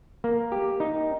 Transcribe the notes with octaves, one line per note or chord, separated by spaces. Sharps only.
A#3
G4
D#4